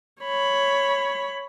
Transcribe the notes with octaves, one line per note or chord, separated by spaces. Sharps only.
C#5 B5